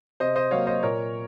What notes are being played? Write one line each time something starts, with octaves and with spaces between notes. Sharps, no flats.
C3 C5 D#5
C5 D#5
F#3 A#3 C#5 F5
C5 D#5
A#2 A#4 C#5